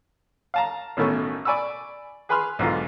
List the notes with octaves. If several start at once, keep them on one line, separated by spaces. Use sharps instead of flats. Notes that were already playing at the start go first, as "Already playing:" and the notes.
F5 A5 A#5
A1 B2 D#3 A3 C#4 C#6
D5 G#5 B5 C#6 E6
G#4 B4 G#5 B5 C6 F6
B1 G#2 D3 F4